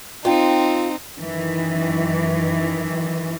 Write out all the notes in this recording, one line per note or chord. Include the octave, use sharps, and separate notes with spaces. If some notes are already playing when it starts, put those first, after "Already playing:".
C4 D#4 F4 G5
F#2 D#3 E3